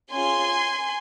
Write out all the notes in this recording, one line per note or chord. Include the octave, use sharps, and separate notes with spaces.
C#4 F4 G#4 G#5 C6